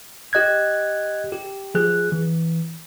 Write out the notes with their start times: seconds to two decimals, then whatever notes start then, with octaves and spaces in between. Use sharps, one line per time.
0.33 G4 D#5 F#6 G#6
1.32 G4
1.75 F3 G#4 F#6
2.12 E3